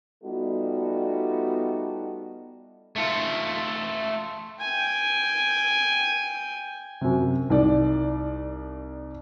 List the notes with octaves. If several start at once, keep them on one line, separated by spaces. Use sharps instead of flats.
G3 A3 B3 D#4 F4 F#4
A3 F4
G5 G#5
F#2 C3
C2 D#4 D5